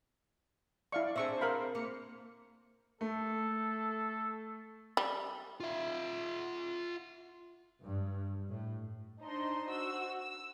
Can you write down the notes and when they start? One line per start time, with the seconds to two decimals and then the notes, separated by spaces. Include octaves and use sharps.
0.92 E4 D5 F5 C#6
1.16 C4 D4 G#4 C5 E5 C#6
1.41 A#4 F5 B5
1.75 A#3 C#7
3.01 A3 A4
4.97 G3
5.60 F4 E5
7.82 G2
8.50 A2
9.21 D4 D#4 C5 D#5 C6
9.69 F#4 C5 E6
10.19 E6